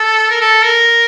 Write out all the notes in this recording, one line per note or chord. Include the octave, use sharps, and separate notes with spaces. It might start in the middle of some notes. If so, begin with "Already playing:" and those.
Already playing: A4
A#4
A4
A#4